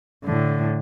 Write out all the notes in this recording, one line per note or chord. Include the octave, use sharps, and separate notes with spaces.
A2 D3